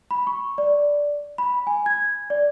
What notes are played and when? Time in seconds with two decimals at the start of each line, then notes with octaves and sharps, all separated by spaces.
0.11 B5
0.27 C#6
0.58 D5
1.38 B5
1.67 G#5
1.86 G#6
2.30 D5